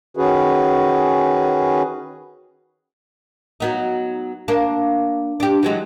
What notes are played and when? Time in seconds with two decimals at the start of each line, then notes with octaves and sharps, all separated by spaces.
0.17 D#3 C#4 F#4 G#4 B4
3.60 F#3 B3 D#4
4.48 A#3 D4
5.40 D4 G4
5.63 E3 F#3 G#3